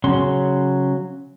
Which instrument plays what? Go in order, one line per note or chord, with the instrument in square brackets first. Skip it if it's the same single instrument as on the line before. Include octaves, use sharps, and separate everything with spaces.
[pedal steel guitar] C#3 F#3 C#4 C6